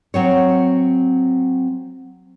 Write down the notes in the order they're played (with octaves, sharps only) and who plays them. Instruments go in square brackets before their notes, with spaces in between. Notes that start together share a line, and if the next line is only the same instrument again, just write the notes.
[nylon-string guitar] F#3 C4 C#5